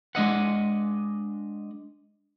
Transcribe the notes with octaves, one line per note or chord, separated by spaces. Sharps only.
G#3 D4 D#5 F#5